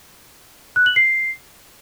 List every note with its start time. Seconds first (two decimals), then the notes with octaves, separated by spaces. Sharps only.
0.76 F#6
0.86 F#7
0.96 C7